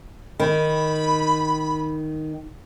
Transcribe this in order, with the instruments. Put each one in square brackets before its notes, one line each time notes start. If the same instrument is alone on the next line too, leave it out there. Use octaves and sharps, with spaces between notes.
[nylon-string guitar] D#3 [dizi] B5